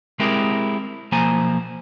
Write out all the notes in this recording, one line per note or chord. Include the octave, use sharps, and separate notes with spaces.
G#3 C4 E4 G4 G#4 A#4
B1 F3 A#3 C5 G#5 A#5